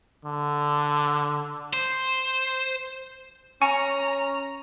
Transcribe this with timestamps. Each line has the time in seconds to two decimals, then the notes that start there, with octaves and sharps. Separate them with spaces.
0.25 D3
1.73 C5
3.62 C#4 G#5 A#5 C#6